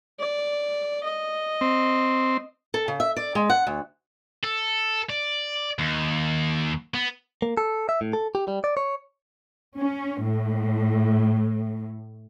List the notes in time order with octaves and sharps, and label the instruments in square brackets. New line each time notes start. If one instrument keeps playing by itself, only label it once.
[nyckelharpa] D5
D#5
[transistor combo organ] C4
[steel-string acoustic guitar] A4
C#3
E5
D5
G#3
F#5
D2
[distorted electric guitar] A4
D5
D#2
B3
[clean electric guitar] A#3
A4
E5
A2
A4
G4
G3
D5
C#5
[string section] C#4
A2